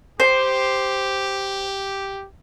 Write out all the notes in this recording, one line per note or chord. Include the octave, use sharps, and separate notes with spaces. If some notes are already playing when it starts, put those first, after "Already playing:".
G4 C5